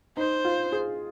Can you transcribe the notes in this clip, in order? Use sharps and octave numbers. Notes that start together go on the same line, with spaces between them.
D#4 C5
F4
G#4